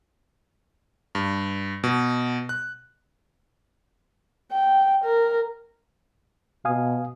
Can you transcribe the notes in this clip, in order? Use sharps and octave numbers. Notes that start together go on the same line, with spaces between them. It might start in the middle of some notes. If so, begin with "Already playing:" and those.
G2
B2
F#6
G5
A#4
B2 F5 G#5 D#6